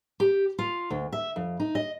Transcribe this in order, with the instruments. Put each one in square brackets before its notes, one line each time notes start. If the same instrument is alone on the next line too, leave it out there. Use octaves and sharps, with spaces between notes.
[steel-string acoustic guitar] G4
F4
D2
E5
F2
D#4
D#5